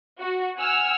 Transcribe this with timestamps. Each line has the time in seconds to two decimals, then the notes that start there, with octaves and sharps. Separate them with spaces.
0.20 F#4
0.57 F#5 G#5 E6 F6